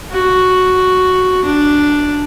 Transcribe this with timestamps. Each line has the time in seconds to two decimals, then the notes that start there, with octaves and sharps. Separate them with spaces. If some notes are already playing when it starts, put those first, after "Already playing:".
0.11 F#4
1.45 D4